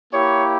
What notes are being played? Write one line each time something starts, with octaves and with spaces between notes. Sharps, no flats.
A#3 E4 G4 C#5